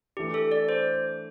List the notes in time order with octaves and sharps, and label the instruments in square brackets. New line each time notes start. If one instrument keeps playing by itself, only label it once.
[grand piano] E3 A3 D4 [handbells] G4
[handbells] A4
D5
C5